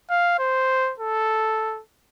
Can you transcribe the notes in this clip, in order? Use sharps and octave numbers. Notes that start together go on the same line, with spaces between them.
F5
C5
A4